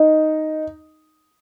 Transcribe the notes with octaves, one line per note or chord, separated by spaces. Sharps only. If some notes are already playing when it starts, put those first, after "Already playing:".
Already playing: D#4